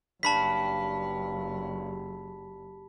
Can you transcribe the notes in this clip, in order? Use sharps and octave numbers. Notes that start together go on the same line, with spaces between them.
F#1 G2 A5 B5 B6